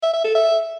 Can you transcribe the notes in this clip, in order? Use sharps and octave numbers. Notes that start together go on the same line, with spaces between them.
E5
E5
A4
E5